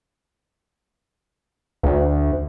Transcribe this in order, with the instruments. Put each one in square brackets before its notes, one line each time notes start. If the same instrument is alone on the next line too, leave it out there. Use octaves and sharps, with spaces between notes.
[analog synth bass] D2